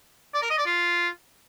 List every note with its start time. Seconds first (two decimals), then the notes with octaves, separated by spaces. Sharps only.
0.34 D5
0.42 A#4
0.50 D#5
0.58 D5
0.66 F4